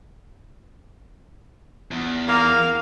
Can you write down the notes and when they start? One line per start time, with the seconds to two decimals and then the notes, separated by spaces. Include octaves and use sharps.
1.91 E2
2.28 A#3 F5